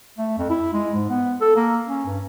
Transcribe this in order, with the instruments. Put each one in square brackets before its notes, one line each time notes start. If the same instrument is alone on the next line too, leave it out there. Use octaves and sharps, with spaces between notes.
[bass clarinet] A3
F2
E4
G#3
G#2
B3
A4
A#3
C#4
G2